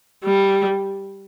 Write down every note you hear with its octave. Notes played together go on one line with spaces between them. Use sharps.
G3